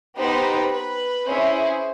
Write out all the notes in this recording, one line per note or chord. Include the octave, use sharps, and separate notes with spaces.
B3 D#4 G4 B4 C5
B4
C#4 E4 G#4 C5